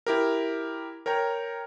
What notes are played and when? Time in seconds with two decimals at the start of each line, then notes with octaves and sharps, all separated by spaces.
0.07 E4 G4 A#4
1.06 A#4 C#5 G5 A#5